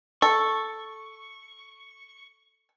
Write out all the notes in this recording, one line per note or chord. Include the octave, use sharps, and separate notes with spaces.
A4 C#6